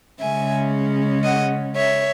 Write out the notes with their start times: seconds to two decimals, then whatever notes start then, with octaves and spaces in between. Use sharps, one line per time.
0.20 C#3 G#3 C#4 E5 G#5
1.23 D#5 F#5
1.75 C#5 E5